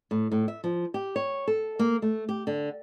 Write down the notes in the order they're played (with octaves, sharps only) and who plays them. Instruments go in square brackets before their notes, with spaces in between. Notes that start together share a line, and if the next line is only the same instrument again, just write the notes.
[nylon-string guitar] A2
A2
E5
F3
G4
C#5
A4
A#3
A3
G4
D3